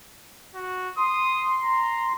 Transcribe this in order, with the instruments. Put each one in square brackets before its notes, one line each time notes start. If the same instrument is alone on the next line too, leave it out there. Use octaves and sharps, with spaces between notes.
[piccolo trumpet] F#4
[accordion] C6 [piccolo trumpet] D#6
[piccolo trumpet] A#5